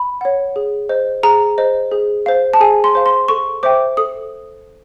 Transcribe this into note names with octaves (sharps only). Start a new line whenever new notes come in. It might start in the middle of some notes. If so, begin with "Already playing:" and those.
Already playing: B5
C#5 F#5
G#4
C5 D#5
G#4 A#5
C5 D#5
G#4
C5 F5
A5
G#4 G#5
C6
C5 F5
C6
A4 C#6
C5 E5 G5 D6
A4 D#6